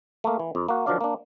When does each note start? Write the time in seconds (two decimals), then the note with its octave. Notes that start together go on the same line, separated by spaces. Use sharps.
0.24 A3 A#3
0.39 E3
0.55 F2
0.69 A#3 F#4
0.86 D#3 F3 F#3 D4 D5 F5
1.01 A#3 D4